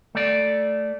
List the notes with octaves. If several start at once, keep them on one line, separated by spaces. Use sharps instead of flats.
A3 D5